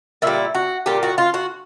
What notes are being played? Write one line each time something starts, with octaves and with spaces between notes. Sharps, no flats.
A#2 G3 E4
F#4
A#2 G3 G4
F#4
F4
F#4